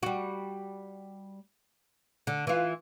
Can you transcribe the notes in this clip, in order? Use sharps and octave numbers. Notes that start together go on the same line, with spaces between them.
G3 F#4
D3
E3 F4